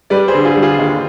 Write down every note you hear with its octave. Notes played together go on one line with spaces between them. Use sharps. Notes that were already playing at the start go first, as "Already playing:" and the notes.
G3 B4 D5
G#4 C5
D3
F4 G#4
G3
F4 G#4
D#2